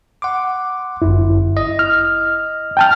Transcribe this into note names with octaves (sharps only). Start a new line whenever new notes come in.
F#5 C6 D6
G1 F#2 E4
D#5
F6
G5 A5 F6